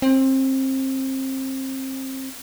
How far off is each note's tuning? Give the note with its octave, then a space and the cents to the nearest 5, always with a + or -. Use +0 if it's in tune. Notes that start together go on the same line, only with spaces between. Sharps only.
C4 +25